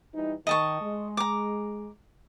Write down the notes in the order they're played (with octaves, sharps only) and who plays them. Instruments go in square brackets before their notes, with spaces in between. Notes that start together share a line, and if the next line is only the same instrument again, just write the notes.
[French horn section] E3 G3 D#4
[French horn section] D#3 [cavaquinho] D#5 A5 C#6
[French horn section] G#3
[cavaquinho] A#5 D6